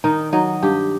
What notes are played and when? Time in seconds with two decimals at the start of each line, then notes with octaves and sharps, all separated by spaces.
0.04 D#3 D#4
0.33 F#3 D#4
0.62 G2 G4